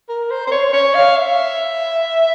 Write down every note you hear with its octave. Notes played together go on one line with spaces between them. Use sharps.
A#4
C5
C5
C#5
C#5
F5
E5